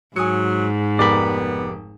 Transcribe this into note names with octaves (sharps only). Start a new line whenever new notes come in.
G#2 F#3 G#5 D#6 C#7
F1 B3 G4 A#4 D5 B5